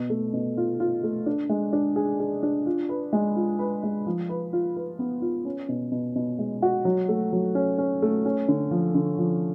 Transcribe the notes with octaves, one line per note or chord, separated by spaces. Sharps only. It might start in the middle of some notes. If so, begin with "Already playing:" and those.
Already playing: B2
A3
B2
F4
F4
A3
D4
G#3
D4
G#4
G#4
D4
F4
B4
G#3
F4
B4
G#3
F3
B4
F4
B4
B3
F4
C#4
B2
B2
B2
G#3
F#4
F#3
A3
F#3
C#4
C#4
A3
C#4
D3
F3
D3
F3